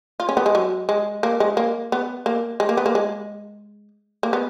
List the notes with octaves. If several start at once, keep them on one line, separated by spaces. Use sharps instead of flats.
F4
C#4
B3
G#3
F#3
G#3
A#3
G#3
A#3
B3
A#3
G#3
A#3
B3
A#3
G#3
A#3
B3